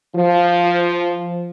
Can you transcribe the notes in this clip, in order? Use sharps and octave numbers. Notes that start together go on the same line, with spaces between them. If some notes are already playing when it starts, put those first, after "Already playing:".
F3